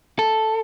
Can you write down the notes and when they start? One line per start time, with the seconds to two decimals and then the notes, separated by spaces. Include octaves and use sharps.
0.19 A4